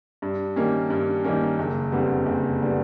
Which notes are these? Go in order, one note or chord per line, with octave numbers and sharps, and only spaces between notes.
G2
D#3 G3 A#3 C#4
G2
D#3 G3 A#3 C#4
F#1
F2 D3 G3 B3
F#1
D3 G3 B3